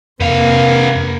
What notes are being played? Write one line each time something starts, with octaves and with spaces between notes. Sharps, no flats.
F2 C3 A#3 B3 F5